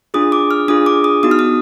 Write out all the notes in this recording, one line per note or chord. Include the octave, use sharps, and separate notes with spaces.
D4 F4 G#4 D#6
D6
F6
D4 F4 G#4 D#6
D6
D#6
B3 D#4 F#4 D#6
F6
D#6